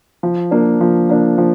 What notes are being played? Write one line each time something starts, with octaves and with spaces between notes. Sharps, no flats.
F3
A#3 D4
F3
A#3 D4
F3